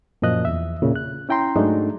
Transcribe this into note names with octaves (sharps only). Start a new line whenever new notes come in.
F#2 A#2 F3 D#5 F#6
E2 E5
A#2 C#3
F#6
C#4 E4 G5 A#5 C6
G#2 F#3 G#3 A3 D4 D#4